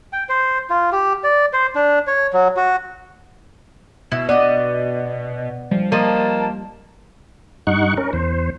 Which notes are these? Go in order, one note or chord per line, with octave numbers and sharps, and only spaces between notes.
G5
C5
F4
G4
D5
C5
D4
C#5
F#3
F#4
B2 E4
B3 D5 D#5
F3 G3
F3 A#3 D#5 A5
G2 D#4 F#5 C#6
C#4 A#4
E2 C5